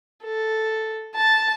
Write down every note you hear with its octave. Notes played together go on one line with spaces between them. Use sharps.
A4
A5